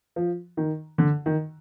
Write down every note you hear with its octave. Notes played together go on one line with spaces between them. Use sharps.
F3
D#3
D3
D#3